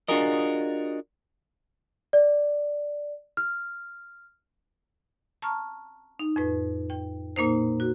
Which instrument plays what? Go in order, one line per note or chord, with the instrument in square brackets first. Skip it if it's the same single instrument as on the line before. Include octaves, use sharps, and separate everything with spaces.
[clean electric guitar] D4 F4 F#4 G#4 A#4 D#5
[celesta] D5
F6
[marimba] A5 A#5 C#6 F6
D#4
F2 A2 B4
G5
A#2 A#3 D#4 C5
F#4